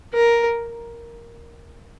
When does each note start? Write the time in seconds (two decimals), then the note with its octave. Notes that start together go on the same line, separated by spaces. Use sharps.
0.14 A#4